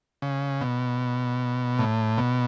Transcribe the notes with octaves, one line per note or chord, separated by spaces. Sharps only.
C#3
B2
A2
B2